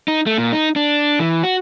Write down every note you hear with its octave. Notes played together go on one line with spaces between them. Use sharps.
D#4
A3
A#2
D#4
D4
E3
F#4